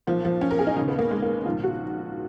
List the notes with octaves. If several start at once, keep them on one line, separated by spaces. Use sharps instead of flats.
B1 A#2 F3
F3
C#4
A#4
G#4
D#4
D#2 C#3 C#4
B3
A#3
G#3
A#3
A#1 G#2 D#3 F4
F#4